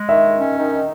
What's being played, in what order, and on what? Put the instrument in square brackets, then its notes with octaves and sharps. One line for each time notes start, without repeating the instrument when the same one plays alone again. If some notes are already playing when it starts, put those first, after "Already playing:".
Already playing: [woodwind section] G#3
[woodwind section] D#3 [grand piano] E5
[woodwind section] C#4
D#3